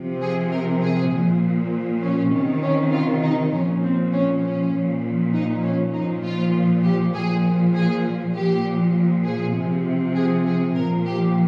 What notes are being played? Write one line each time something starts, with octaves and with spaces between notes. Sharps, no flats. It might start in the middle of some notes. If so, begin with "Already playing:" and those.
Already playing: C3 F3
G#4
A#4
G#4
A#2 F3
C#4
C3 D#3
C#4
F4
D#4
A#2 F3 C#4
C4
C#4
C#4
A#2 F3
D#4
C#4
A#2 F3 D#4
F4
G4
A#2 F3 G#4
G#4
A#2 F3 G4
G#4
C3 F3
G#4
G#4
A#2 F3 A#4
G4